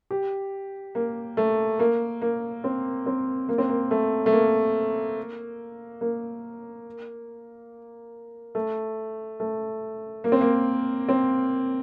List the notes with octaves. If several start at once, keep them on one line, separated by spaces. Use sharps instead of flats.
G4
A#3
A3
A#3
A#3
C4
C4
A#3
C4
A#3
A3
A3
A#3
A#3
A3
A3
A#3
C4
A#3
C4